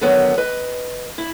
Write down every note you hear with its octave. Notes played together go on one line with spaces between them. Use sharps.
D3 D#3 F#3 B3
B4 D#5
E4